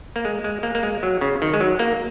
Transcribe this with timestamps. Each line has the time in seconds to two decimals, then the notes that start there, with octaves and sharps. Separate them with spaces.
0.16 A#3
0.25 G#3
0.44 G#3
0.63 A#3
0.75 A#3
0.83 G#3
1.03 F#3
1.21 C#3
1.42 D#3
1.54 G#3
1.60 F#3
1.79 A#3